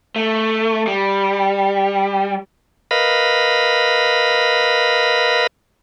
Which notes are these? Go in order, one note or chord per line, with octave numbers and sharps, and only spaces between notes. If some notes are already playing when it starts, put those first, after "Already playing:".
A3
G3
A#4 B4 D#5 F5 B5